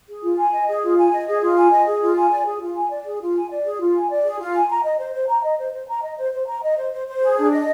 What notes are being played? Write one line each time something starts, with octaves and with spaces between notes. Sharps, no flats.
G#4
F4
G#5
D#5
G#4
F4
G#5
D#5
G#4
F4
G#5
D#5
G#4
F4
G#5
D5
G#4
F4
G#5
D5
G#4
F4
G#5
D5
G#4
F4
G#5
D5
G#4
F4
G#5
A#5
D#5
C5
C5
A#5
D#5
C5
C5
A#5
D#5
C5
C5
A#5
D#5
C5
C5
C5
G#4
D4
D#5